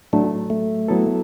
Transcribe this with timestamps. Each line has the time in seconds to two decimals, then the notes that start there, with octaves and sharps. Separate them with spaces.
0.13 A2 F#3 A3 D4
0.50 A3
0.88 F#3 B3 E4 A4